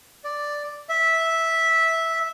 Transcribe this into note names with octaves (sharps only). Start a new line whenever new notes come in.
D5
E5